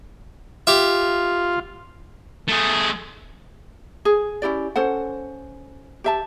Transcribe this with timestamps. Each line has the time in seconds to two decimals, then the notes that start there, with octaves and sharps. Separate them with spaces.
0.67 F4 G4 E5
2.48 A3 G#4
4.05 G#4
4.42 C#4 E4 G4 D5
4.76 C#4 A4 C5 F#5
6.04 G4 E5 A5